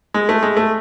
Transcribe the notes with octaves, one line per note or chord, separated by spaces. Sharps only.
G#3
A3
G#3
A3